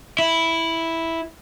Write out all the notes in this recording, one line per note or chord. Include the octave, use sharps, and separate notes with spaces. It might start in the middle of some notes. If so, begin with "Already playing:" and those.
E4